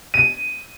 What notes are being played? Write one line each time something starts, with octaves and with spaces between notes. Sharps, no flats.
D#7